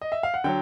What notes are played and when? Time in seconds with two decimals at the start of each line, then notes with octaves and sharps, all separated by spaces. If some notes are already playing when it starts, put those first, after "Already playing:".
0.02 D#5
0.12 E5
0.23 F5
0.34 F#5
0.44 D3 F#3 G5